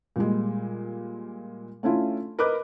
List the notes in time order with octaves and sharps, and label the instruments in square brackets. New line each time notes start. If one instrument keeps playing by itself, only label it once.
[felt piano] A#2 G3 G#3
A3 C#4 D4 E4 F4
A#4 B4 D#5 B5 D6 F#6